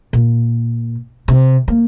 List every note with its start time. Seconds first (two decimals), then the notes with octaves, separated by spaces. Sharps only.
0.13 A#2
1.28 C3
1.68 A#3